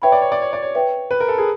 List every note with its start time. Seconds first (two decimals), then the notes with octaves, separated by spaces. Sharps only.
0.02 B4 C#5 E5 G5 B5
0.12 D5
0.22 C#5
0.32 D5
0.42 C#5
0.53 D5
0.62 C#5
0.75 B4 E5 G5
1.11 B4
1.20 A#4
1.28 A4
1.38 G#4